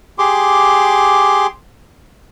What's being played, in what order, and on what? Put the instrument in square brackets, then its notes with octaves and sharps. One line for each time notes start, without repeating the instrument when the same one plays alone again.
[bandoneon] G4 G#4 C6 D6